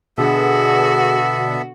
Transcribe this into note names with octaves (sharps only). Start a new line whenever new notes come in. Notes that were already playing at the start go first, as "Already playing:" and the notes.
B2 D3 B3 F#4 G#4 A4 E5